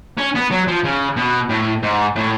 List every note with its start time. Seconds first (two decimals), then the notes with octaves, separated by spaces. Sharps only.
0.18 C#4
0.35 B3
0.51 F#3
0.67 F3
0.84 C#3
1.16 B2
1.49 A2
1.83 G#2
2.16 A2